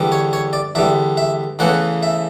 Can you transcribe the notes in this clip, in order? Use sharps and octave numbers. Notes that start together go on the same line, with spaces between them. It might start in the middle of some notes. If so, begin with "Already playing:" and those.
Already playing: E2 D3 G3
C#5
C#5
D5
E2 D3 G3 E5
E5
E2 C#3 E3 A3 F#5
E5